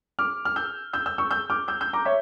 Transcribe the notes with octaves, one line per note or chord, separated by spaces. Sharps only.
D6 F6
F6
E6 G6
E6 G6
E6 G6
C#6 E6
E6 G6
D6 F6
E6 G6
E6 G6
A#5 D6
C#5 E5